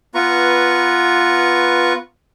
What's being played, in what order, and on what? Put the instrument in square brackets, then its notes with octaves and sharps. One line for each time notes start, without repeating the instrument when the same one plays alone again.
[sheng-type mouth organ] B3 F4 B4 A#5 C#6